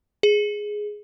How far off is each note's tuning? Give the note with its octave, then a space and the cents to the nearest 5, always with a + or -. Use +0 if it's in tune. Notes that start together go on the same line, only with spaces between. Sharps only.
G#4 +5